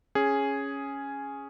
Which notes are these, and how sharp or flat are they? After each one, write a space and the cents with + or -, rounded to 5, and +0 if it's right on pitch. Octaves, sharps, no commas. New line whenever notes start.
C#4 +0 G#4 +0